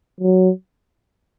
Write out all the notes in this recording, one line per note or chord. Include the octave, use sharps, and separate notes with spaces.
F#3